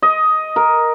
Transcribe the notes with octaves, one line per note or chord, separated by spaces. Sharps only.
D#5
A#4